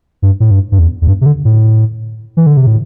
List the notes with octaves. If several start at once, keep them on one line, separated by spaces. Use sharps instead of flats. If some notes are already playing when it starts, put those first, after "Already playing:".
G2
A2
G2
G2
E2
E2
G2
C3
D3
A2
E3
D3
C3
A2